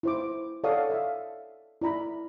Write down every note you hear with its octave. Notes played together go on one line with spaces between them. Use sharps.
E4 C5 D6
A4 C#5 D5 F5 F#5 D#6
E5 F5
E4 D5 A#5 B5